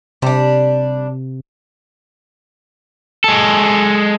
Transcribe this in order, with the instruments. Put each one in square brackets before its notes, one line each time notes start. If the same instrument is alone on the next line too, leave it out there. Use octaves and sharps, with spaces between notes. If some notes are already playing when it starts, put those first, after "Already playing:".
[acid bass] C3 [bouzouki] G3 D4
[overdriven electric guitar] G#3 A4